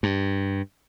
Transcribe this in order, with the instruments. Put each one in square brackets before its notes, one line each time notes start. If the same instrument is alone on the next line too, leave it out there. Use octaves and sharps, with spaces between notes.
[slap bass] G2